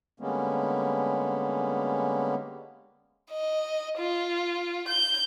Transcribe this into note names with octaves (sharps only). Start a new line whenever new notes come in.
D3 G3 G#3 A#3 B3 C#4
D#5
F4
G6